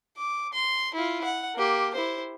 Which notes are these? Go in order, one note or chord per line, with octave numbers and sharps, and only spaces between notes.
D6
C6
E4 F4
F#5
A#3 G4
E4 C5